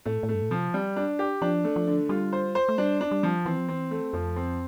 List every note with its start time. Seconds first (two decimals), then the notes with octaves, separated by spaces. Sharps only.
0.05 A2 A3
0.23 A2
0.29 A3
0.34 G2
0.42 A2
0.50 B2 F3
0.57 C3
0.74 G3
0.96 D4
1.19 G4
1.42 F3 D4
1.64 A3
1.76 F3
1.87 D3
2.09 G3 F4
2.33 C5
2.55 C5
2.69 A3
2.78 G3 D4
3.01 D4
3.11 G3
3.23 F3
3.46 E3 C4
3.57 F3
3.68 E3 C4
3.91 A3
4.13 F2 F3
4.36 C4